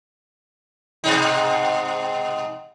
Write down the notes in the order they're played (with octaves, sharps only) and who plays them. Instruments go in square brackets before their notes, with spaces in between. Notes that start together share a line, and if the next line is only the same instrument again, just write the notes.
[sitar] G#2 B2 D#4